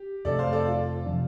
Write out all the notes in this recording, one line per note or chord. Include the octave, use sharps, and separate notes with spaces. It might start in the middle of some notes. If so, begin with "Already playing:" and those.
Already playing: G4
F2 C3 A3 C4 A4 D5
C5 F5
A4 D5
F4
C3 F3 D4